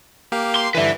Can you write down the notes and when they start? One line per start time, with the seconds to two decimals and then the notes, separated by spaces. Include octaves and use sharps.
0.32 A#3 G4 F5
0.56 C6
0.74 G2 D3 E3 B4 E5